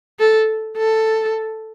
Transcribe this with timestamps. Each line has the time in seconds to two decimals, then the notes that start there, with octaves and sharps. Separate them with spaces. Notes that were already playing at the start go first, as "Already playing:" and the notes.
0.19 A4
0.77 A4